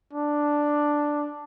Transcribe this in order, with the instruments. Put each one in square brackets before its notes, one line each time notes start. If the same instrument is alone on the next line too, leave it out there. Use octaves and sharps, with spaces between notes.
[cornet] D4